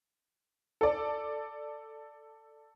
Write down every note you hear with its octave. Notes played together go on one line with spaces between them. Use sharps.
A4 D5